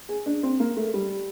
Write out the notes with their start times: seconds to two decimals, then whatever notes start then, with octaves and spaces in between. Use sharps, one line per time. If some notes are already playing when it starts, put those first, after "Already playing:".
0.09 G#4
0.26 D4
0.43 C4
0.60 A#3
0.77 A3
0.94 G3